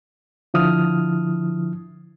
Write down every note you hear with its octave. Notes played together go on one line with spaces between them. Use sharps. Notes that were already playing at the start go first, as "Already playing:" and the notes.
D3 F3 E4 D#6 F6